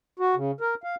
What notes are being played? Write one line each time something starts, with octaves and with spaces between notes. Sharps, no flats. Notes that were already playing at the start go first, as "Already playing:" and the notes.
F#4
C#3
A#4
F5